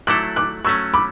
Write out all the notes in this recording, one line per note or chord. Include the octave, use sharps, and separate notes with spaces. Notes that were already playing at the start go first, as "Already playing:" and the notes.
F#3 A3 E4 A4 D6 F#6
D6 F#6
F#3 A3 C#4 C#6 E6
B5 D6